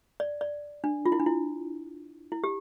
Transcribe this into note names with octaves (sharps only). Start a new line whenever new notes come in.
D5
D5
D4
F4
E4
D4
E4
E4
G4